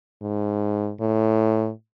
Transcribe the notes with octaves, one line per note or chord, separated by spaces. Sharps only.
G#2
A2